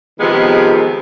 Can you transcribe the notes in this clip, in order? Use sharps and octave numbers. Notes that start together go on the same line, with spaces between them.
C3 D#3 F3 G#3 B3